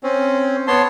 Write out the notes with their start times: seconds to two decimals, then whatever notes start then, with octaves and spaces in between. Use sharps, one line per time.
0.03 C4 C#4
0.67 B3 C#5 A5 C6